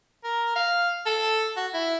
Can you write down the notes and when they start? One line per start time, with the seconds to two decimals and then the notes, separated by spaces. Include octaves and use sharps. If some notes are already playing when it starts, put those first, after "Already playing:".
0.24 A#4
0.56 F5
1.06 A4
1.57 F#4
1.74 E4